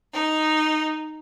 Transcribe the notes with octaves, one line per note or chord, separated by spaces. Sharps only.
D#4